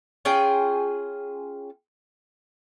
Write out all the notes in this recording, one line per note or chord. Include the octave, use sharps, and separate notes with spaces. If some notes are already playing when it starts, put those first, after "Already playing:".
C#4 F4 G#4 G5